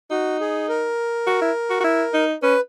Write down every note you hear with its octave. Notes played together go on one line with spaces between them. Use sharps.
D#4 F#4
G#4
A#4
F#4
E4
F#4
F#4
E4
D#4
C#4 B4